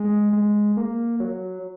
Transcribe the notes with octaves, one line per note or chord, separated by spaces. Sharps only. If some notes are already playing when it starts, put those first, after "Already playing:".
Already playing: G#3
G#3
A#3
F#3